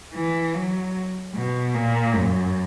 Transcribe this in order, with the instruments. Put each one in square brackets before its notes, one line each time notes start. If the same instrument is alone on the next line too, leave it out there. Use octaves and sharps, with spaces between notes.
[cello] E3
F#3
B2
A#2
F#2